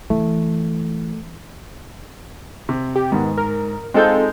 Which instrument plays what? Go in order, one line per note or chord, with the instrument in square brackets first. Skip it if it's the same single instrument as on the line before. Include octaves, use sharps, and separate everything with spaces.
[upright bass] E3 [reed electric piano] A3
[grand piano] C3
[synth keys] G4
[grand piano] G#2 [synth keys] D#3 B3
[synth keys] A#4
[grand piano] G#3 D#4 G6 [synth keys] C4 F4 A4